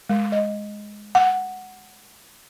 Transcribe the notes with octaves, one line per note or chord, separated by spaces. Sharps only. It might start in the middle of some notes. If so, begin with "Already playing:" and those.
G#3
D#5
F#5